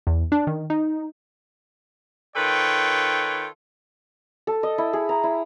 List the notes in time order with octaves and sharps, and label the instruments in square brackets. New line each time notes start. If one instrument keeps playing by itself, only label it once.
[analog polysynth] E2
D4
D#3
D#4
[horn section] D#3 F4 A4 B4 C#5 G5
[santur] A4
D#5
E4
G#4
A#5
E4